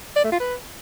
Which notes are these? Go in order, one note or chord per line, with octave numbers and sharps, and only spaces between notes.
D5
A3
F4
B4